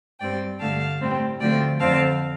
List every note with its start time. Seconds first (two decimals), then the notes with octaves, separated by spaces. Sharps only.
0.20 G2 G3 C4 D5 G5
0.60 G2 D3 A3 F5 A5
1.00 A2 G3 C4
1.40 D2 D3 F3 A3 C4 D5 G5
1.80 F2 D3 F3 C4 F5 A5